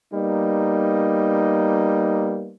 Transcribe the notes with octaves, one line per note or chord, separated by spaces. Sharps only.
G3 A#3 B3 D#4